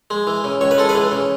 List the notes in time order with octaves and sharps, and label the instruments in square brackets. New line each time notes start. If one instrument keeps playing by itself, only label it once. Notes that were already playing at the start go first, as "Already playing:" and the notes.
[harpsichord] G#3
E3
C#3
C#2 C#5
B4
G#3 A4
G#4 B4
E3
C#3